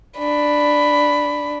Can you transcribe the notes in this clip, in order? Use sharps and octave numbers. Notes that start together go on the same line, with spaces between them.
D4 B5